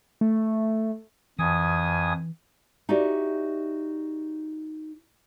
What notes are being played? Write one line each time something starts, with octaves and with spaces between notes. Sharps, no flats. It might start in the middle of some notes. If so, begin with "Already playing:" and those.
A3
F2 E3 G#5 D#6
D#4 F#4 G4 D5 E5